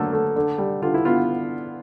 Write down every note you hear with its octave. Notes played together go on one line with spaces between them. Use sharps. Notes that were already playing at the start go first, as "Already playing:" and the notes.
Already playing: D3 F#3 A3 A#3 A4
A3
D3
G3
D3 F4
E4
B3 F4